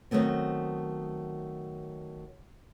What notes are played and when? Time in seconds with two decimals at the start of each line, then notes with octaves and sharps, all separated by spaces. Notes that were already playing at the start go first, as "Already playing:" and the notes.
0.11 D#3 F#3 A3 B3 C4